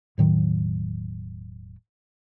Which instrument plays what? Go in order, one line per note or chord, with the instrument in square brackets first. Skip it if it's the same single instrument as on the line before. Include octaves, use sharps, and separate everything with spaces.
[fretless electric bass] E1 A2 D#3 F#3